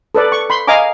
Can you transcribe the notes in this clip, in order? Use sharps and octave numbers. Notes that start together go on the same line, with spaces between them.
A4 B4 D5
C#6
B5 C6
D#5 F5 G#5 A#5 D6